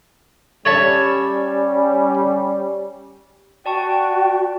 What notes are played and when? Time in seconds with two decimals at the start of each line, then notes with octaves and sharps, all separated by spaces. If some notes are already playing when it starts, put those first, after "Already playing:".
0.65 G3 C#4 C#5 E5 A5
3.66 F#4 D5 G5 A5 C#6